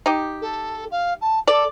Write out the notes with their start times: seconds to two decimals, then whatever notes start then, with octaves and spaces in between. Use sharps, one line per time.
0.06 D#4 G4
0.41 A4
0.91 F5
1.21 A5
1.48 A4 D5